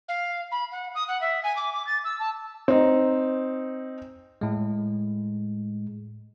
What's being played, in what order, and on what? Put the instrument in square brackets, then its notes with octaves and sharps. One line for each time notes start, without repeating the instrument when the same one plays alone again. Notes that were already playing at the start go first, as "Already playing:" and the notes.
[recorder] F5
B5
F#5
D#6
F#5
E5
G#5
D6
D6
A6
E6
A5
[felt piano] C4 D#4
[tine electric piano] A2 G#3